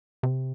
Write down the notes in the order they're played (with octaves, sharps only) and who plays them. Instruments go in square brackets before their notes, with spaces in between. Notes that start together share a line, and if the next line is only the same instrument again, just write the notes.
[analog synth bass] C3